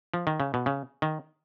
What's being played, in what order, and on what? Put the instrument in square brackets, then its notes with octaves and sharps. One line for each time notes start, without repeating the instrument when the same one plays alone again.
[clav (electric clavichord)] F3
D#3
C#3
B2
C#3
D#3